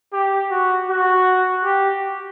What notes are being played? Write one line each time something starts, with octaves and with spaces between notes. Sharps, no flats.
G4
F#4
F#4
G4